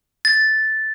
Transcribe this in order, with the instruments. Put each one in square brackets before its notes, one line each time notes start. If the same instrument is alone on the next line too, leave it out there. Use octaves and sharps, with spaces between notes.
[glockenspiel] A6